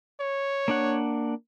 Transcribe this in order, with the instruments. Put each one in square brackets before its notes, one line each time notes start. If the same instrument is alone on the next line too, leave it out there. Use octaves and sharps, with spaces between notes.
[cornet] C#5
[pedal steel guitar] A#3 D4 F#5